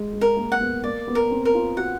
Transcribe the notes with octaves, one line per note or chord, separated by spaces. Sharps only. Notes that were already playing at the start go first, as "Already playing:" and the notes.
Already playing: G#3
G#3
A#4
A#3
F#5
B3
A#3 D5
B3
A#4
C4
A#4
F4
F#4 F#5